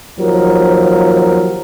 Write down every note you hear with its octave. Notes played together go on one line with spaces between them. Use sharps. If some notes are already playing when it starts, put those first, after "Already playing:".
D#2 F3 F#3 A#4